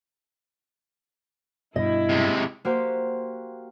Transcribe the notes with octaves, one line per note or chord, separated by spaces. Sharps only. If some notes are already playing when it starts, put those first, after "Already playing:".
G2 B2 E4 D#5
C3 G#3
A#3 F#4 G4 C5